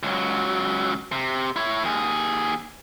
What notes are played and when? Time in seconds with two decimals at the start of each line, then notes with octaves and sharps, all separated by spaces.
0.03 C#2 F#3
1.12 C3
1.56 E4 C#5
1.84 D#2 G#4